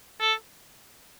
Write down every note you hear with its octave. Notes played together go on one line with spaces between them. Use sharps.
A4